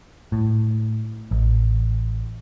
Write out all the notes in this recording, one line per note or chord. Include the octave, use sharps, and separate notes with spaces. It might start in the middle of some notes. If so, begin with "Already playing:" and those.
A2
A1